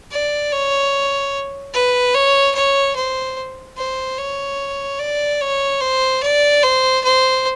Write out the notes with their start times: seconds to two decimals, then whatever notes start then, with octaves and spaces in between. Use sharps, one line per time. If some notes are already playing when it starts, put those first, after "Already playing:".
0.11 D5
0.52 C#5
1.74 B4
2.14 C#5
2.55 C#5
2.95 C5
3.77 C5
4.18 C#5
4.99 D5
5.41 C#5
5.81 C5
6.21 D5
6.63 C5
7.04 C5